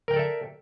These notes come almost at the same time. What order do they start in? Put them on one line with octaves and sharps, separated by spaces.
A#4 G5 D5 A4 E5